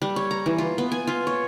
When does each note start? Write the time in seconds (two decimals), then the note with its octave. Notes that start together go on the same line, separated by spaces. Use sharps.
0.02 G3
0.16 C#5
0.31 A#5
0.46 E3
0.58 F4
0.78 B3
0.92 G#5
1.07 F4
1.27 C#5